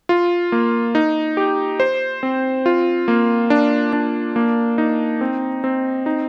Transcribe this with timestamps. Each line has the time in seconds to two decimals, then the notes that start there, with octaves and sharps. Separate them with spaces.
0.09 F4
0.52 A#3
0.95 D#4
1.37 G4
1.80 C5
2.23 C4
2.66 F4
3.08 A#3
3.50 D4
3.93 D4
4.36 A#3
4.78 D#4
5.21 C4
5.64 C4
6.06 D#4